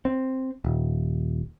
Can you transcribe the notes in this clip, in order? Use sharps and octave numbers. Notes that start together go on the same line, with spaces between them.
C4
D#1